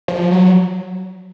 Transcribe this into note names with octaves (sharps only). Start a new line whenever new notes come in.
F3
F#3